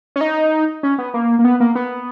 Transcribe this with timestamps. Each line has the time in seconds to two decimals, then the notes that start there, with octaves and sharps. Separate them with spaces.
0.16 C#4
0.21 D#4
0.83 C#4
0.98 B3
1.14 A#3
1.39 A#3
1.45 B3
1.60 A#3
1.75 B3